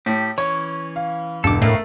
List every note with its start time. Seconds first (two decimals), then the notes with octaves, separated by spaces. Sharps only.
0.06 A2 G4
0.38 E3 C#4 C#5
0.96 F5
1.44 E1 G2 A4 D6
1.62 A2 A3 D#4 F#4 A4 A#4 F5